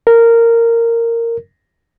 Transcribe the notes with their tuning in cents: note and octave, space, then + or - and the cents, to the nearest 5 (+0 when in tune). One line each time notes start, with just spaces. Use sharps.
A#4 -10